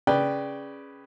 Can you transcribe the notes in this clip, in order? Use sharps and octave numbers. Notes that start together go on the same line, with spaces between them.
C#3 B4 D5 G5